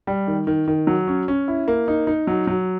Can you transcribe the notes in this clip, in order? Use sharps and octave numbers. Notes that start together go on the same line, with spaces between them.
G3
D#3
D#3
D#3
F#3
C#4
C#4
E4
A#3
D#4
D#4
F#3
F#3